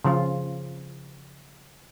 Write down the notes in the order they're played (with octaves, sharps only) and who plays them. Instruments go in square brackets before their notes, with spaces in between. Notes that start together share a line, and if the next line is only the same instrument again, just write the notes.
[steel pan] C#3 F3 F4